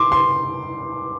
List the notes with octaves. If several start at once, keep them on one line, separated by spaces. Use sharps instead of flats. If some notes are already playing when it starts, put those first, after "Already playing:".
Already playing: C6 D6
C6